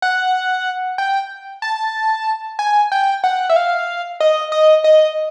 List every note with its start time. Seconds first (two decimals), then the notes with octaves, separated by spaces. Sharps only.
0.02 F#5
0.98 G5
1.62 A5
2.59 G#5
2.92 G5
3.24 F#5
3.50 E5
3.56 F5
4.20 D#5
4.52 D#5
4.84 D#5